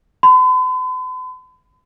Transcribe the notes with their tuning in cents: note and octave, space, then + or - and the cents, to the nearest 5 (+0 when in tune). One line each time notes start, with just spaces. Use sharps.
B5 +45